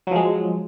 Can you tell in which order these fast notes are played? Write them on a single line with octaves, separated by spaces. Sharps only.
F#3 F3 G#3